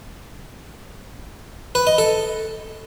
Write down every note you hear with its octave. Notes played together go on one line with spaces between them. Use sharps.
B4
D#5
A4